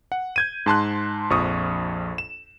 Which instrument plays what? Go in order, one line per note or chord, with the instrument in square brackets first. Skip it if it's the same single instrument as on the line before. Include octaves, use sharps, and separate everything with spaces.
[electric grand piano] F#5
G6 G#6 D#7
G#2 A5 C6 F#6
A#1 F2 C#6 D#6
E7